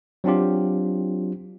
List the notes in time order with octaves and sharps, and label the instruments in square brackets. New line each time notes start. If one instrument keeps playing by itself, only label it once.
[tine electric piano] F#3 C4 D4 F4 G4